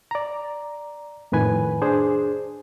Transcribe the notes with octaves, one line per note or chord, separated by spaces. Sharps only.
D5 A#5
F2 A2 D#3 B4 G#5
D4 G#4 C5